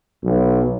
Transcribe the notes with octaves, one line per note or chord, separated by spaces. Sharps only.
B1